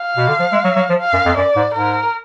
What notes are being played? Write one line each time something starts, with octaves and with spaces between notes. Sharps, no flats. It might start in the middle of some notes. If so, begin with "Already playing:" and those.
Already playing: F5
B2
D3
F3
G#3
F#3
F#3
F3
F5
F#2
F2
F#2 D5
G#2
G#2 A#4